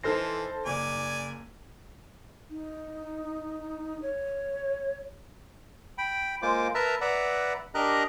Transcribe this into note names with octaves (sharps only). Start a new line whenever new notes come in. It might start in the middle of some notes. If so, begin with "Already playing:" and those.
E3 D#4 A4 C5 F6 A#6 C7
F#1 D5 G#5
D#4
C#5
G5 B5
G#3 A#3 F4 C5 D6
A#4 B4 E5 A5 A#5
B4 D5 E5 F#5 A#5
D4 G4 A#4 D#5 A#5 F#6